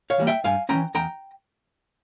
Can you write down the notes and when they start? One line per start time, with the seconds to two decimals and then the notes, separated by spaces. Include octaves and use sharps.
0.10 C#5 F5
0.18 E3 G3 A#3
0.27 E5 G5
0.44 G2 F5 G#5
0.69 E3 G#3 C#4 G5 A#5
0.95 E2 G5 A#5